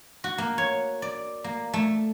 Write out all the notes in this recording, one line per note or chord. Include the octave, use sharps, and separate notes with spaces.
F#4
A#3
C#5
D5
A#3
A3